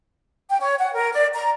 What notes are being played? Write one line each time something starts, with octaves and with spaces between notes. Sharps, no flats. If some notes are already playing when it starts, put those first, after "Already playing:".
G5
C#5
F#5
A#4
D5
A#5